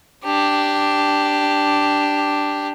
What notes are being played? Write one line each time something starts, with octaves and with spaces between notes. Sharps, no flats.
D4 G4